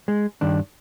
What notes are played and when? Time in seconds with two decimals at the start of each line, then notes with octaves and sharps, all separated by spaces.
0.08 G#3
0.41 G2 D#3 D4